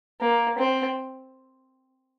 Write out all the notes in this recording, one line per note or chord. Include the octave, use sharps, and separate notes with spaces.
A#3
C4